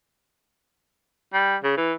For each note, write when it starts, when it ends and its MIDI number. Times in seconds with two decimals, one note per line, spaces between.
1.34 1.56 55
1.64 1.73 49
1.77 1.94 52